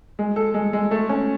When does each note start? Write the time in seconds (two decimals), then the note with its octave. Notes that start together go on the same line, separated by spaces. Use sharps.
0.19 G#3
0.36 A4
0.54 G#3
0.73 G#3
0.91 A3
1.09 C#4